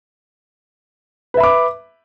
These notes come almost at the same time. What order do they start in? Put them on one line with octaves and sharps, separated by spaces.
B4 E5 B5 D6